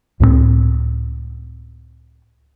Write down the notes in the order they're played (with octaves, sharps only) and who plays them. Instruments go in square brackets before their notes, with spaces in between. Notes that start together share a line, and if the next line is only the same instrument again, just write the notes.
[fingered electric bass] C#2 A2 G#3 C4